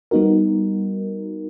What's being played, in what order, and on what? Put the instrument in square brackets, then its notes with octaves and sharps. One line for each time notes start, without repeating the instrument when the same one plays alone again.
[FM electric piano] G3 B3 D#4 F#4 A#4